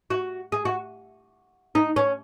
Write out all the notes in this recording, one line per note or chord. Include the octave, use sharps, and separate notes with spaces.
F#4
G#4
F#4
D#4
C#4